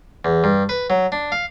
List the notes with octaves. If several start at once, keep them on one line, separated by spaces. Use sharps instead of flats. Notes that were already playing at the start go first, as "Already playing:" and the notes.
E2
G2
B4
F#3
D4
F5